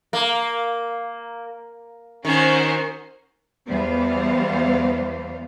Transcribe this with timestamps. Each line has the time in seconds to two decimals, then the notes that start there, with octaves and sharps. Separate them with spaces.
0.13 A#3
2.25 D#3 C#4 F#4 C5
3.69 E2 E3 G3 B3 C5 F5